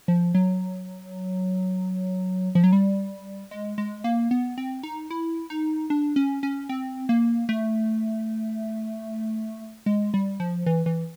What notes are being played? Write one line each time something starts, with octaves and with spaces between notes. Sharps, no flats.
F3
F#3
F3
F#3
G3
G#3
G#3
A#3
B3
C4
D#4
E4
D#4
D4
C#4
C#4
C4
A#3
A3
G#3
G3
F3
E3
E3